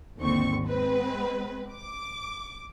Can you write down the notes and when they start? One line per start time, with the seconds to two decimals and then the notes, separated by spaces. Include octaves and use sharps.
0.22 G#1 D#2 D3 C4 C#6
0.67 G#3 C4 B4
1.72 D6